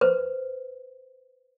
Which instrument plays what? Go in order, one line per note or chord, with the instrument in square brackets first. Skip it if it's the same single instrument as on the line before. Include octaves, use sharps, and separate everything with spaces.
[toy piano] B4 C5